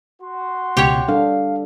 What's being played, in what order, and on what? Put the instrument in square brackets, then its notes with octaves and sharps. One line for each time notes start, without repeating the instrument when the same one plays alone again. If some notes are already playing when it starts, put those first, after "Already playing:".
[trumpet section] F#4 C6
[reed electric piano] C#2 B2 [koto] G4 C#5
[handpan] G3 D4 A4 [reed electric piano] F5